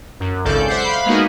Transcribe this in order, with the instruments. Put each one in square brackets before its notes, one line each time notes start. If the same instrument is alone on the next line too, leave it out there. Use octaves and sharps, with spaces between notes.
[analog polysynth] F#2
G#1 C#2 C#3 A4 D5 G6
C5 E5 F#5 D6 G6 C7
F5 B5
G#3 A#3 B3 D#4 F#4 G#4